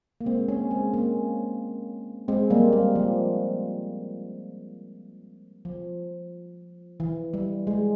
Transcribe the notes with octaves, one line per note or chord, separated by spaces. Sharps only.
A#3
G#3 C4
A#3 C#4
G#3 C4
A#3 C#4
G#3 C4
G3 A#3
G3
F3
F3
E3
G3
G#3